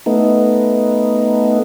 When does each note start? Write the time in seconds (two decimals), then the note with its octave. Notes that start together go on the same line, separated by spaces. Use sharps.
0.06 A3 B3 D#4